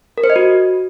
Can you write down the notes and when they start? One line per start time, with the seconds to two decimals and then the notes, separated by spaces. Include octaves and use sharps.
0.18 A#4
0.24 C5
0.30 D#5
0.36 F#4